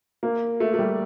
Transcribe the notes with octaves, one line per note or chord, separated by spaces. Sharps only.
A#3
A3
A3
G3